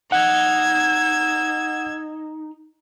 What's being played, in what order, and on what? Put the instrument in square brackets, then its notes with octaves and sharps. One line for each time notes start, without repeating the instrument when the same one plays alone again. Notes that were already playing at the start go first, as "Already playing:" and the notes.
[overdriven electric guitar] D#4 [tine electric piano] F#5 [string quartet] E6 G#6